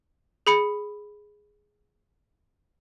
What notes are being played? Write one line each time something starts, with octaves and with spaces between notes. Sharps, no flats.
G#4 B5 C#7